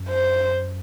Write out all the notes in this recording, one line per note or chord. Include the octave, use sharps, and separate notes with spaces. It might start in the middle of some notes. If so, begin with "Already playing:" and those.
Already playing: F#2
C5